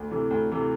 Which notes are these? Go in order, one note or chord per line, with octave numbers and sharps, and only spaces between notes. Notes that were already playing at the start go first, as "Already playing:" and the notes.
Already playing: D2
C3 E3 A3
D2
C3 E3 A3